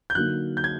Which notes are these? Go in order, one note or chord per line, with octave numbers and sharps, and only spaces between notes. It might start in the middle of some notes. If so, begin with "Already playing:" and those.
G6
D3 F#3 A#3 D#4 F#6
G6
G#6